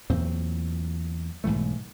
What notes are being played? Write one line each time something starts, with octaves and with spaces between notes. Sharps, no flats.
E2 A#2 F#3 C4
B1 G#2 E3 A3